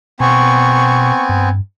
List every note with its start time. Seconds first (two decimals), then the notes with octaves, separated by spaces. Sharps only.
0.20 B2 B3 C4 G#5 C#6
1.29 G2